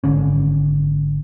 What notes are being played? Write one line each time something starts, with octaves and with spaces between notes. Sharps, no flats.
G#1 D3 C#4